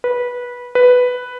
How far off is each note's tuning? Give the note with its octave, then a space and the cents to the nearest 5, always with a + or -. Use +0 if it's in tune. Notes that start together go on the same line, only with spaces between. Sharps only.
B4 -15
B4 +5